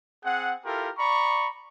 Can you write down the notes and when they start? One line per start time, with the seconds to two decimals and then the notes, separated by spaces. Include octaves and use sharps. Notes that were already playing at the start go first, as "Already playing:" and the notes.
0.24 C4 G#4 F#5
0.65 E4 F4 G4 A4 A#4
0.98 D5 A#5 B5 C#6